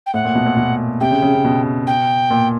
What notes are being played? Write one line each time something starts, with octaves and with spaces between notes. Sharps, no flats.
G5
A2 F#5
A#2
B2
A#2
B2
C3 G5
C#3
C#3
C#3
B2
G5
A#2